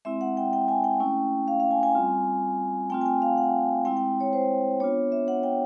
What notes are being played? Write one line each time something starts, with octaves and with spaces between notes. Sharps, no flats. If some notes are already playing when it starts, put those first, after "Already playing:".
G#3 C4 E4 E5
F#5
G5
G5
G#5
G5
A3 C#4 E4
F5
F5
G#5
G#5
G3 C4 F4
A3 C4 F4 G5
G#5
G5
F5
F#5
G#3 C4 E4 G5
G5
C#5
C5
B3 D4 F4 C#5
E5
F#5
G5